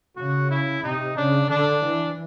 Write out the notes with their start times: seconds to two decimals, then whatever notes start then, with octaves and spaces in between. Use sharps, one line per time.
0.16 C#3 F#4
0.50 E4
0.83 C3 D#4
1.17 C#3 D4
1.50 D3 D4
1.83 E3